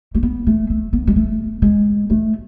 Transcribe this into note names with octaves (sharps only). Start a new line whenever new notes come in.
A3
B3
A3
A3
B3
G#3
A3
G#3
A3